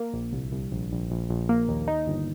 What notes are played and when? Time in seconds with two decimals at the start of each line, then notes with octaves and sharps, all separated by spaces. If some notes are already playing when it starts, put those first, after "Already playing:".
Already playing: A#3
0.13 A#1
0.33 C2
0.52 C2
0.72 A#1
0.91 A#1
1.10 A#1
1.29 A#1
1.49 A#3
1.68 D#2
1.88 D#4
2.07 G1